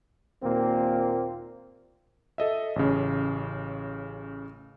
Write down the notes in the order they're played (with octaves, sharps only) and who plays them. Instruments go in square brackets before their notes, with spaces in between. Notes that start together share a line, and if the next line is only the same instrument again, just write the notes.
[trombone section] D#2 A#2 A#3 C4
[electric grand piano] A4 D#5 E5
A1 C#3